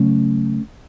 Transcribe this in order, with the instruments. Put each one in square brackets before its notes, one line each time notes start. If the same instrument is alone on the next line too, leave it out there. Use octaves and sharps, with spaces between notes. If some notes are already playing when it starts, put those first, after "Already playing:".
Already playing: [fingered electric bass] C#3 F#3 A3 C#4